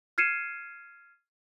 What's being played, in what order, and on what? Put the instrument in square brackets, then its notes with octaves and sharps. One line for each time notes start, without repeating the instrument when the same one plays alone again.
[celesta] F6 G#6 C7 C#7 D#7 E7